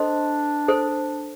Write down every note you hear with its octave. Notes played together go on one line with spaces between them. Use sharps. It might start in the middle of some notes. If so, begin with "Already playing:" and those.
Already playing: D4 A4 C5 D#5 C6
A4 C5